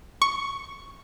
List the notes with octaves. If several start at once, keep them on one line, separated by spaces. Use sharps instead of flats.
C#6